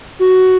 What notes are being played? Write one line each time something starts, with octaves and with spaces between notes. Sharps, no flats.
F#4